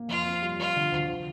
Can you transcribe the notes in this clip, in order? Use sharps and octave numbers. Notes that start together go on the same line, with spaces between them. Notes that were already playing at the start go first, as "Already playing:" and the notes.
Already playing: A#3
F2 F4
C4
G3
F3 F4
D3
D2
F3